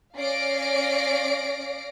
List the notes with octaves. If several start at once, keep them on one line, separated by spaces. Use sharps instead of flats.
C#4 D5 F5 A#6 C7 D7